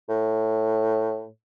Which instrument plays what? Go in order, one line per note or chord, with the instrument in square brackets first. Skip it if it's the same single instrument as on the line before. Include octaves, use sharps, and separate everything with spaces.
[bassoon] A2